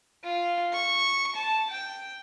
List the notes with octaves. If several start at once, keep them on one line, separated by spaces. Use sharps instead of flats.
F4
C#6
A5
G5